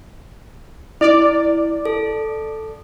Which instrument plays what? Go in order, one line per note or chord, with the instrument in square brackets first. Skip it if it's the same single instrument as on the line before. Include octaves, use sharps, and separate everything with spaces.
[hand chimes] E4 [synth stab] D5
[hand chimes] A4